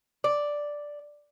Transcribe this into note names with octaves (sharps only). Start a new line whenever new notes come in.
D5